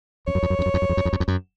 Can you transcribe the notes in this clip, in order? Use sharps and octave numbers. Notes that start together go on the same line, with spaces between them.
F2 C#5
F#2
F2
F#2
F2
F#2
F2
F#2
F2
F#2
F2
F#2
F2
F#2